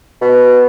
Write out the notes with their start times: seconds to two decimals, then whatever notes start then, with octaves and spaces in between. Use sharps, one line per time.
0.22 B2